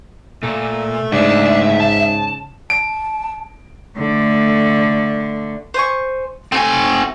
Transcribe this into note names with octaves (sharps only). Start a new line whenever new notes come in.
A#2 A3
G#2 C#3 A3 D4 G#4 E5
C#3 A5
A5 D7
D3 A3
C5 G#5 C#6
A3 C4 F#4 C#5 G#5